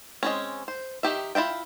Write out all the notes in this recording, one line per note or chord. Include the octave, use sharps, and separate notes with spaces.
G#3 C4 C#4
C5
D#3 G4 E5
E4 F4 E5 G5